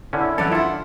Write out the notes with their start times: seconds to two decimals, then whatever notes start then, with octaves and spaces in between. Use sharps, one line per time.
0.13 D3 C#4 E4
0.38 E3 C#4 A4 D5 F#5
0.52 D4 E4 F4 A4 F#5